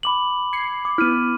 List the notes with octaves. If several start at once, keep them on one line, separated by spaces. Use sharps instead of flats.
B5 D6 F#7
G#6 C7 C#7
D6
B3 E4 F6 D#7